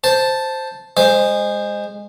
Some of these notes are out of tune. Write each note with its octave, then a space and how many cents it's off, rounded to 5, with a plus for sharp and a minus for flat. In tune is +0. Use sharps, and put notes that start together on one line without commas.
C5 +0 A5 +0
G#3 -20 C5 +0